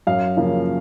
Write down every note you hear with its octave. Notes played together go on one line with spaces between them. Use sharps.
F#2 F5
C#3 F3 A#3